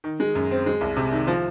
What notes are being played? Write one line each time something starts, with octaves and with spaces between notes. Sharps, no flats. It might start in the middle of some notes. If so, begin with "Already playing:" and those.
D#3
G#3
F#2
C4
G#3
C2
C3
D#3
F3